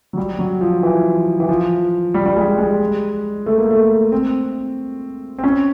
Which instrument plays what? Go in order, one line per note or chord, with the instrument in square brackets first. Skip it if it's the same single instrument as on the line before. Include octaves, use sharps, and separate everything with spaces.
[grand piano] F#3
G3
F#3
F3
E3
E3
F3
G3
G3
G#3
G#3
A3
A#3
A3
C4
C4
C#4